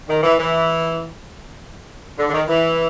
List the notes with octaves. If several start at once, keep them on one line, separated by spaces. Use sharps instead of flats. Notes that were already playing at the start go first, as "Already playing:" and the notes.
D#3
E3
E3
D3
D3
D#3
E3